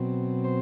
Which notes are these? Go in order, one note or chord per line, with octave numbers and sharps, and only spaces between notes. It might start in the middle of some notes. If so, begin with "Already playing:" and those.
Already playing: B2 F#3 C4
C5